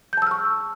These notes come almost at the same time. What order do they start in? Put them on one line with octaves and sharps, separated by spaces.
G6 A5 E6 F6 C#6